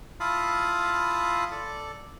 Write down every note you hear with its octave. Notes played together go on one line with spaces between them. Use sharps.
E4 F4 F5 A5 B5 D#6
A4 D5